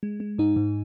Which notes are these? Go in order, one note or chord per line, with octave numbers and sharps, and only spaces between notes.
G#3
G#3
G#2 D#4
G#2